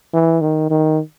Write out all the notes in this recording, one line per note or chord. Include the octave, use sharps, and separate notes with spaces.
E3
D#3
D#3